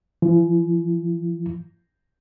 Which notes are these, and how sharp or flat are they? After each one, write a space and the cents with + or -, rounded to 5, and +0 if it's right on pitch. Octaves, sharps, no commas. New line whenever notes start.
E3 +45